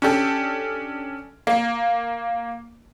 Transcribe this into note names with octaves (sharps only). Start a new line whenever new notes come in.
C#4 D4 G4 A4
A#3